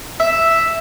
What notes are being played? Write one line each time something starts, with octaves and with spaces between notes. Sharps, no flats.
E5